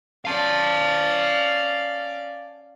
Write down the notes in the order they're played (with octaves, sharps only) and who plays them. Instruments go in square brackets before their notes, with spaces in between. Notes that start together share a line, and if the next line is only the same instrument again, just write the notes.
[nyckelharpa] C#4 D5 [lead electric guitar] F5 A5